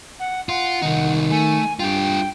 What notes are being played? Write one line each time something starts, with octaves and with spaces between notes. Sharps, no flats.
F#5
F4 F#5
C2 D#3 D#4
A3 G#5
G2 F4 G4 G5